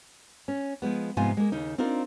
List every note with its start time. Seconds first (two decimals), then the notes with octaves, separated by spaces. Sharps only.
0.48 C#4
0.82 F3 G#3 B3
1.17 G#2 C3 F3 B3 F4 G#5
1.37 G#3 A#3
1.52 D#2 C#3 D#4
1.78 C4 D4 D#4 F4 A#4